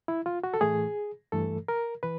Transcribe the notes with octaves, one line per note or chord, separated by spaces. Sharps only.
E4
F4
F#4
A4
A2 E3 A3 G#4
G2 E3 A3 A4
A#4
E3 B4